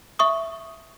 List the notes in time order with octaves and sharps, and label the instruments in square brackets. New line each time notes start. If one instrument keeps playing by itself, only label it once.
[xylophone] E5 C#6 D#6